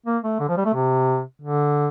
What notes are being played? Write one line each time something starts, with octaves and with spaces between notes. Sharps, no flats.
A#3
A3
D3
F3
G3
A3
C3
D3